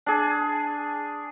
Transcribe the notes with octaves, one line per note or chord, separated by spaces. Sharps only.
D4 G#4